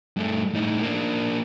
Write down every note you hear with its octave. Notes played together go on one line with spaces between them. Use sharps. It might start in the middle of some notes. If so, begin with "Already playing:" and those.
G2 A3
A2 D#4
A#3 D4